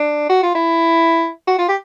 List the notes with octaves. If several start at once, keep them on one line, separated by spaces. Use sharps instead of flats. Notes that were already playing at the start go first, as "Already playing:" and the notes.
Already playing: D4
F#4
F4
E4
F#4
F4
G4